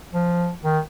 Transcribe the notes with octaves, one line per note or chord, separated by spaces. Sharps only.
F3
D#3